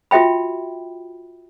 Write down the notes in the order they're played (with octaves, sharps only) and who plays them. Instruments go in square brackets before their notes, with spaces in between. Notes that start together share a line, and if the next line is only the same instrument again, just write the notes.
[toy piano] F4 F#4 E5 G5 B5